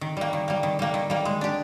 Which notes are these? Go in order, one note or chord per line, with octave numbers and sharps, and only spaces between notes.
D#3
G3 A#3
D#3
G3 A#3
D#3
G3 A#3
D#3
G3 A#3
G#3
D4 G4